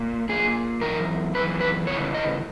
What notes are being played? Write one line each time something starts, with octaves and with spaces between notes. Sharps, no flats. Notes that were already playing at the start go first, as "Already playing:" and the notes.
Already playing: A#2
A#2 G#4
F#2 E3 A#4
F#2 E3 B4
B4
E2 C#3 E3 C#5
D#5